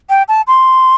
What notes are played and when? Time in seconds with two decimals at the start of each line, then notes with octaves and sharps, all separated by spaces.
0.10 G5
0.28 A5
0.47 C6